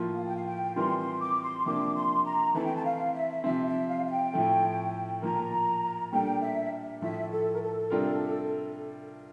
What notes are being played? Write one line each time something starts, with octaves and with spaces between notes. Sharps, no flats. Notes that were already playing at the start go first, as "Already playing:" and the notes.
Already playing: A2 F3 A#3 F4
F5
G5
F5
G5
E3 G3 C4 F4 A#4 C6
C6
D6
C6
C3 F3 A#3 D4 D6
C6
A#5
E3 A3 C4 E4 A5
G5
A5
F5
E5
C3 F3 C4 E5
E5
F5
F5
G5
A2 F3 A3
A#2 F3 A#3 A#5
A#2 G3 D4 A4 G5
E5
A2 F3 A3 E5
A4
A#4
A4
C3 G3 D4 F4 A#4